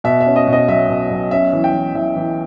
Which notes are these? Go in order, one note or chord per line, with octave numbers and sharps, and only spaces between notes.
B2 E5
E5
C#4
D#5
B2
D#5
B1 E5
B2
B1
C#4 E5
E3
G5
E3
E3 E5
E3